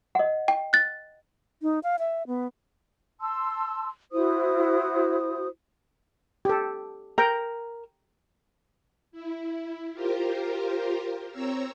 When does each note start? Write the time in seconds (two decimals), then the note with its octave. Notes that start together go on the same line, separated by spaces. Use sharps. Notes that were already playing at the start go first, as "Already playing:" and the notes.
0.15 D#5 F#5
0.48 G5
0.73 F#6 A6
1.62 D#4
1.84 F5
1.99 E5
2.27 B3
3.20 A5 C6 E6
4.12 E4 F#4 C5 D#6
6.45 G4 A4
7.18 A#4 G5 A#5
9.12 E4
9.93 F4 G4 A#4 C5
11.31 C4 C#5 A#5 E6